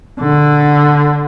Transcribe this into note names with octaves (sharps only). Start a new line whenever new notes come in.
D3